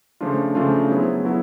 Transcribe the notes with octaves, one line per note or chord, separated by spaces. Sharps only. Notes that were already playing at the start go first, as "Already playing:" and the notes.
C#3 F3 A3 D4 F4
C#3 F3 A3 D4 F4
F#3 B3 E4 G#4 C5
F#3 B3 E4 G#4